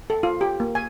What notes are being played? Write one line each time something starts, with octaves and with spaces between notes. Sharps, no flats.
A4
F4
G4
A#3
G#5